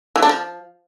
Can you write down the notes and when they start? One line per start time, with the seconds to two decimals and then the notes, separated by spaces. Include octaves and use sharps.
0.16 E3
0.22 D4
0.29 F3